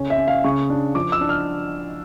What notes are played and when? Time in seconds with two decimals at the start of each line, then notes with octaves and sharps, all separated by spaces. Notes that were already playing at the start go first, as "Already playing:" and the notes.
Already playing: C#3 C#4
0.10 E5
0.18 C#4
0.28 F5
0.44 C#3 C#6
0.70 D4
0.95 F3 D6
1.12 E6
1.21 D4
1.29 F6